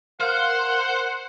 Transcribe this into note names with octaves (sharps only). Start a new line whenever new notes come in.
A#4 C5 F5 F#5